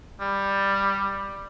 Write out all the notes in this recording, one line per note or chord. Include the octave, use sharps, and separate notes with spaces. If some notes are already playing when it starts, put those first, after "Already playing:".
G3